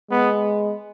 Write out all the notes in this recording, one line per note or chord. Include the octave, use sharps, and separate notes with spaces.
G#3 B3